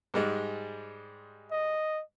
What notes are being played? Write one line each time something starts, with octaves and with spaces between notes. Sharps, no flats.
G#2 G3 G#3
D#5